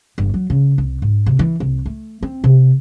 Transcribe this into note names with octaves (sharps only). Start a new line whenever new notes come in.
G1
F#3
C#3
C2
G#2
C3
E3
C2
A3
C4
C3